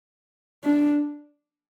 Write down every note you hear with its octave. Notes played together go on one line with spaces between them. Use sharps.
D4